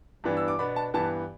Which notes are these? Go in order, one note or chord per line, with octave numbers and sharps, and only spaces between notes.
G2 E3 B3 D4
E6
D6
B2 B3 D4 B5
A5
G2 E3 B3 A5